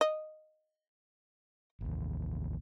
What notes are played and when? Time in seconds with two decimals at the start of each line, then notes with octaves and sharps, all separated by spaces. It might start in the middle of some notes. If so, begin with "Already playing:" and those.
0.01 D#5
1.81 A1 D#2